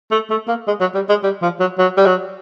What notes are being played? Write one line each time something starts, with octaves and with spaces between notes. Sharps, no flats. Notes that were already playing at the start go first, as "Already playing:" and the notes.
A3
A3
A#3
G#3
F#3
G3
G#3
G3
F3
F#3
F#3
G3
F#3